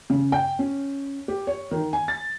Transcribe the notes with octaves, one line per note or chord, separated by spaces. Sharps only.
C#3
G5
C#4
G4
C#5
D#3
G#5
A6